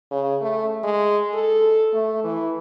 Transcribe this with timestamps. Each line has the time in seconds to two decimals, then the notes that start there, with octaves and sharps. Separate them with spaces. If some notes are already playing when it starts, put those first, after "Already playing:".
0.11 C#3
0.41 A3
0.84 G#3
1.34 A4
1.94 A3
2.24 E3